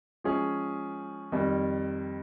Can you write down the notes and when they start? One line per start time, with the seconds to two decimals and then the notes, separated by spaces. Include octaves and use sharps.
0.24 F3 G#3 C#4 G#4
1.32 F2 D#3 G3